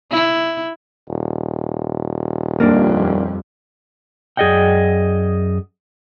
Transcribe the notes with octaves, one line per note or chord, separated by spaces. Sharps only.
E4
D#1
F2 G3 A#3 D4
F#2 G#4 D5 D#5 F#5 G5